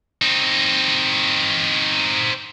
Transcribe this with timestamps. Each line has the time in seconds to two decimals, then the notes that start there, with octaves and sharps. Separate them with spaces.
0.22 C4 D#4